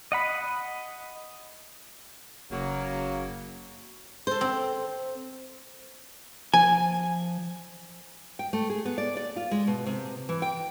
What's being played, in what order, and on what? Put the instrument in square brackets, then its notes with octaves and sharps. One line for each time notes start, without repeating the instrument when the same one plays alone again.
[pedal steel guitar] D#5 F#5 B5
[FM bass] F#1 [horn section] C#3 F#3 A#3
[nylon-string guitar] A4 C5
[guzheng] C4
[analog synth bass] F3 [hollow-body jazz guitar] G#5
[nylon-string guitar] G5
A3
G#4
B3
D5
D5
F4
G#3
B2
C3
E3
G5